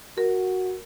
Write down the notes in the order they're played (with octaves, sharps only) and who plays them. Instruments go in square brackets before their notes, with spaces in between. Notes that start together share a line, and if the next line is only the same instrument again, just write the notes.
[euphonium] F#4 [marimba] A#4